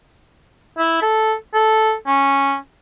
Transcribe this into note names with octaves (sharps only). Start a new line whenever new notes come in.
E4
A4
A4
C#4